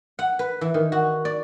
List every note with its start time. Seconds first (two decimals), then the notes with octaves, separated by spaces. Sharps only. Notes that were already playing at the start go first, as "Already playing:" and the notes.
0.19 F#5
0.39 B4
0.61 E3
0.74 D#3
0.92 F#4
1.25 D5